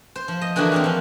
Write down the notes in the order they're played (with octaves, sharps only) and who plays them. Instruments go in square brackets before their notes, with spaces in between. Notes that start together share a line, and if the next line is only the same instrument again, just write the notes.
[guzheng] C5
F3
D#5
D3 E3 A#3 D4 F#4 G#4
A#3 C4 G#4 C#5 F5
F3 F5